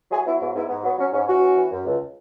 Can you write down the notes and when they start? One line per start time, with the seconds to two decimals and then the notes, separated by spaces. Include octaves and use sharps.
0.11 F#3 E4 G#4
0.25 F#3 B3 E4
0.40 G#2 B3 E4
0.55 G#2 B3 E4
0.69 G#2 B3
0.84 F#3 B3
0.98 F#3 C#4
1.12 G#2 C#4
1.27 E3 C#4 F#4
1.42 E3
1.56 E3
1.71 F#2
1.85 C#2